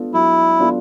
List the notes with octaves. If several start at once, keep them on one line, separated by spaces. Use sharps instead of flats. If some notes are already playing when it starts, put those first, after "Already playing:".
Already playing: B3 D4 F4 A4
F#3 E4
B3 D4 F4 A4